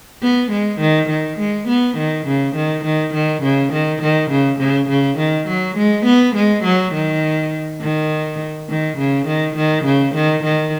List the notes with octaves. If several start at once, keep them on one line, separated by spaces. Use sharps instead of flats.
B3
G#3
D#3
D#3
G#3
B3
D#3
C#3
D#3
D#3
D#3
C#3
D#3
D#3
C#3
C#3
C#3
D#3
F#3
G#3
B3
G#3
F#3
D#3
D#3
D#3
C#3
D#3
D#3
C#3
D#3
D#3